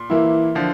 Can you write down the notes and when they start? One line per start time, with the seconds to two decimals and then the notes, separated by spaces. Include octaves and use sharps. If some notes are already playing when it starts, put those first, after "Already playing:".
Already playing: A#2
0.10 E3 A#3 E4
0.55 D3 F3